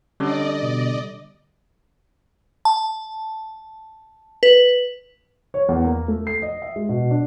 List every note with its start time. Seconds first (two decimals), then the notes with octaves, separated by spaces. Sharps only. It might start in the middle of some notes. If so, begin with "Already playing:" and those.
0.20 D3 G3 C#4 D5 D#5
0.62 B2
2.65 A5
4.43 B4
5.54 C#5
5.69 E2
5.84 A#3
6.08 A3
6.27 C7
6.42 D#5
6.62 E5
6.76 G#3
6.89 B2
7.11 D4